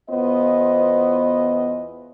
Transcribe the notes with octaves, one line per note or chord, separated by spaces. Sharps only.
E2 B3 F4 C5 D#5